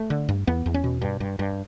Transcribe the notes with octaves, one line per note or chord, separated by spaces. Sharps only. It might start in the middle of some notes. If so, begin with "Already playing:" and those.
Already playing: A3
D3
G2
E2 B3
E2
C#4
B2
G2
G2
G2